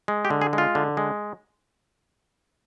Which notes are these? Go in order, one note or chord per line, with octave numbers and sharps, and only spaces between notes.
G#3
G4
D3
G#4
G#3
F4
D3
G#3